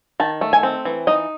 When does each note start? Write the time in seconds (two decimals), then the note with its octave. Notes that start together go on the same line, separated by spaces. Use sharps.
0.20 D#3 A5
0.41 A3
0.53 G#5
0.63 C4
0.85 E3
1.07 D#4 D#5